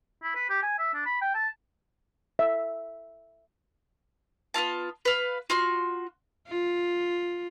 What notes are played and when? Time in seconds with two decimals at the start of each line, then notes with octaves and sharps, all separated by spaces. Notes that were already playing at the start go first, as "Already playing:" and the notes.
0.23 E4
0.35 B4
0.50 G4
0.63 G#5
0.79 E5
0.94 D4
1.06 B5
1.22 G5
1.35 A5
2.39 E5
4.54 B3 C4 F4 A5
5.05 B4 F5
5.50 F4 F#4 C6
6.48 F4